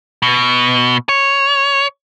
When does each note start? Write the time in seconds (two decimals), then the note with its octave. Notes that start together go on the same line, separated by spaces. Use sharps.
0.22 B2
1.09 C#5